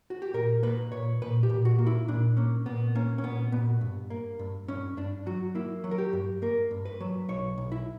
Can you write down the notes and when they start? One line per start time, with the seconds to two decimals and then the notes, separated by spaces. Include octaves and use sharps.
0.10 F#4
0.22 G4
0.34 A#2 A#4
0.63 A#3 B4
0.92 A#2 C#5
1.22 A#2 B4
1.43 G4
1.50 A#2
1.65 F#4
1.78 A#3
1.87 E4
2.08 A#2 D4
2.37 A#3 C#4
2.66 A#2 B3
2.95 A#3 C#4
3.18 C#4
3.23 A#2 B3
3.52 A#2 B3
3.81 G2
4.10 A#3
4.39 G2
4.68 G2 C#4
4.97 G2 D4
5.26 F#3 F#4
5.55 A#3 E4
5.84 F#3
5.91 A#4
5.98 G4
6.13 G2
6.42 A#3 A#4
6.71 G2
6.85 B4
7.00 F#3
7.29 B1 C#5
7.58 B1
7.72 E4